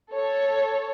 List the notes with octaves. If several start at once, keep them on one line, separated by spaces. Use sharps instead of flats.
A4 C#5